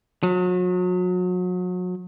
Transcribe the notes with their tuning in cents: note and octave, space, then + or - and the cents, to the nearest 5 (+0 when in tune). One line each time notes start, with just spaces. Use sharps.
F#3 -35